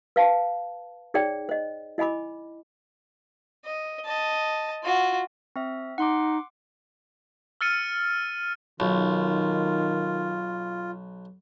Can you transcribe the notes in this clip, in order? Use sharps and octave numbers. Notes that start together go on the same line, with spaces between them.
B4 F5 A5
D#4 G#4 C#5 D5 G5
C5 D#5
E4 D#5 G#5 B5 D6
D#5
D#5 A5
F4 F#4
C4 E5
D#4 F#5 C6 D6
E6 F6 A6 C#7 D#7
B1 D#3 F4